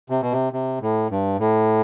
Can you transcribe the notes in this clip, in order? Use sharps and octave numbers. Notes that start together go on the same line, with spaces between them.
C3
B2
C3
C3
A2
G2
A2